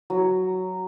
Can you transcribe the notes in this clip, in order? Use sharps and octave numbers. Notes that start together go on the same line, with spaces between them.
F#3